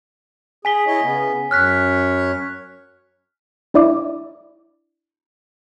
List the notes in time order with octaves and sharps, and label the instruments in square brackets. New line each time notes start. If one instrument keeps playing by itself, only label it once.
[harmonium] G#4 [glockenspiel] G#5 B6 G7
[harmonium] E4 C#5 D#5
C#3 B3
[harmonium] F#2 C#5 [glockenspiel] F6 F#6 B6
[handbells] D4 E4 D5 E5 D6